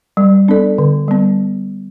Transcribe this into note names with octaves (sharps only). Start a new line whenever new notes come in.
G3
B3 D4 A4 D5
D3
G3 B3